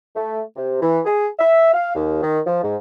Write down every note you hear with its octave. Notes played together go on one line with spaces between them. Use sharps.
A3
C3
E3
G#4
E5
F5
D#2
D#3
F3
G#2